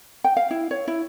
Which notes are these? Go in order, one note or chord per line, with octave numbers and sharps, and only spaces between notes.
G5
F5
E4
C#5
E4